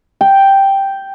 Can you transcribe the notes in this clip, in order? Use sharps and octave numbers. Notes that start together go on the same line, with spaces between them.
G5